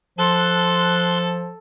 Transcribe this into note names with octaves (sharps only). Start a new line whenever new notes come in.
F3 A4 C6 F#6